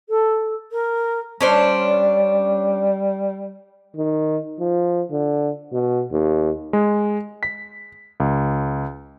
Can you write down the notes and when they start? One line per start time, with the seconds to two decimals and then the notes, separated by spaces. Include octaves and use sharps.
0.08 A4
0.71 A#4
1.41 G3 C#4 D4 C5
3.97 D#3
4.60 F3
5.12 D3
5.73 B2
6.12 D#2
6.73 G#3
7.43 B6
8.20 C#2